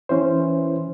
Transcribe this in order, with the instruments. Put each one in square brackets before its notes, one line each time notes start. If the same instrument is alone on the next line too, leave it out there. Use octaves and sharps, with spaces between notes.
[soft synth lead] E3 [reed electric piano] C#4 E4 C5